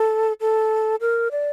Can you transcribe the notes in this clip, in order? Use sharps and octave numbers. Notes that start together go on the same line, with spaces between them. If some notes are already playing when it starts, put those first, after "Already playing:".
Already playing: A4
A4
A#4
D5